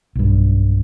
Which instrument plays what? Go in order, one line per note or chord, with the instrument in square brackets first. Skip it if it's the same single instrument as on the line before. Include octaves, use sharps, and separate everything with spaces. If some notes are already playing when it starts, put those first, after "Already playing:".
[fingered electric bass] B1 G2